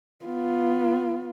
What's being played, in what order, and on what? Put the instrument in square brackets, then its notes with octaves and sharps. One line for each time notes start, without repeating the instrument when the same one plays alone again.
[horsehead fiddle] B3 F4